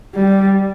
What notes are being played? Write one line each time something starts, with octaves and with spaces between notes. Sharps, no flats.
G3